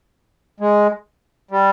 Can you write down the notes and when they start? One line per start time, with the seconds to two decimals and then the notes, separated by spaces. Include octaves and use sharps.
0.60 G#3
1.51 G3